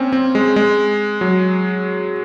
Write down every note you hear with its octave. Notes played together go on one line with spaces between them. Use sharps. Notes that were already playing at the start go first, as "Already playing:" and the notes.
Already playing: A#3 C4 C#4
C4
G#3
G#3
F#3